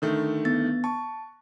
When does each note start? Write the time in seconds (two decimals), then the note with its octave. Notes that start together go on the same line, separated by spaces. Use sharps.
0.02 D3 D#3 A3
0.45 B3 A6
0.84 A5 C#6